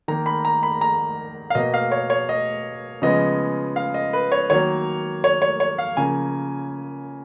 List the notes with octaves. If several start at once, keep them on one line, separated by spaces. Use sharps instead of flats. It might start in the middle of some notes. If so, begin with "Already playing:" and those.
D#3 A#3 A#5
B5
A#5
B5
A#5
F5
B2 A#3 D#5
F5
C#5
C#5
D#5
C#3 F3 G#3 B3 D#5
F5
D#5
B4
C#5
D#3 F#3 A#3 C#5
C#5
C#5
C#5
F5
C#3 F3 A#3 G#5